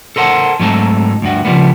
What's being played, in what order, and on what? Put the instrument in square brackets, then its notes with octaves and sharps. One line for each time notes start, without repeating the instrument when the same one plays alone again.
[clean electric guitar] A4 A#4 C5 F#5 A5
G#2 F#3 A3 C4 D#4 A5
D2 G2 F#4
C#3 F3 G3 A#3 B3